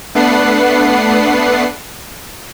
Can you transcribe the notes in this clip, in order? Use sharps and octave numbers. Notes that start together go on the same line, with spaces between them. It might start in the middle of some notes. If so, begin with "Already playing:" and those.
A3 B3 D4 B4 F#5 C7